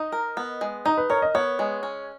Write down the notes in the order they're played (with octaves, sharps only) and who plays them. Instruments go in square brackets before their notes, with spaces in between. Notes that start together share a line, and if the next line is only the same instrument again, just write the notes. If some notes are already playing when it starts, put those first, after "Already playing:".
Already playing: [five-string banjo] D#4 [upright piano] D#5
[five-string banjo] A#4
B3
G#3
[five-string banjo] D#4 [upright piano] D#5
[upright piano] B4
[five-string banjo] A#4 [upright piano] C#5
[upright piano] D#5
[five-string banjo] B3 [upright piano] C#5
[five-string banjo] G#3
C#4